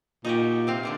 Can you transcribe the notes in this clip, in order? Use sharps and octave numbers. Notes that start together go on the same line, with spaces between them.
A#2 D#4 F#4 G4
C3 C4 F5
A#2 D3 D4